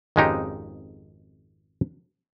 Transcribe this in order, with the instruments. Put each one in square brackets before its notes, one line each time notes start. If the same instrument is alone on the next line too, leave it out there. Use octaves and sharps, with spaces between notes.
[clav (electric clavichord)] G#1 F2 G#3 C#4 D#4 G4